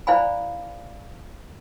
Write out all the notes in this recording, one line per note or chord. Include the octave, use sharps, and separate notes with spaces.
E4 C5 D5 F5 G#5 B5